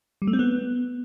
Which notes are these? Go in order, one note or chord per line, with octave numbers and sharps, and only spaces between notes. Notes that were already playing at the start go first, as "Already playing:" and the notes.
G3
A3
C4
B3